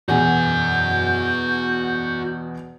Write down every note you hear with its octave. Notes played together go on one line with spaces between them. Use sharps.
E2 B2 F#4 G#5 G6